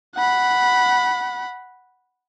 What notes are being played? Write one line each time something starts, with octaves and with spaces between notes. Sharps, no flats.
F#5 B5